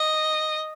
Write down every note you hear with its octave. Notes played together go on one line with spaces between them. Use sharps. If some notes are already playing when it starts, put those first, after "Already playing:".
Already playing: D#5